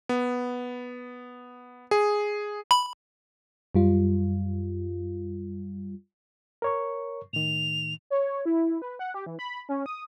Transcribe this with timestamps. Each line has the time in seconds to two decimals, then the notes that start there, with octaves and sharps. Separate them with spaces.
0.09 B3
1.91 G#4
2.71 B5
3.75 F#2 G3 F4
6.62 A#4 C#5 C#6
7.33 A2 D#3 F7
8.10 C#5
8.46 E4
8.82 B4
8.99 F#5
9.14 G4
9.26 E3
9.39 B5
9.69 C#4
9.86 D#6